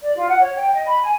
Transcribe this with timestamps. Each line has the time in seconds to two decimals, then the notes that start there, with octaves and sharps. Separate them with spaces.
0.02 D5
0.16 F4
0.28 F#5
0.41 C#5
0.56 G5
0.74 D#5
0.87 B5
1.03 G#5